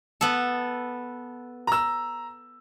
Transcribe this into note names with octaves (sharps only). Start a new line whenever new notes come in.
B3 A4
A#5 E6